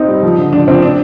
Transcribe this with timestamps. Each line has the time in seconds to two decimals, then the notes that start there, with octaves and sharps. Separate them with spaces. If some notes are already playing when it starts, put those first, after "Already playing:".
Already playing: C4 D#4
0.08 G3
0.23 F3
0.38 D3
0.52 F3 D4
0.68 F3 C4
0.82 D4